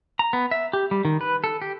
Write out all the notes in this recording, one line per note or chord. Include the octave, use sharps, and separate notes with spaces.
A#5
B3
E5
G4
G3
D#3
B4
A4
G4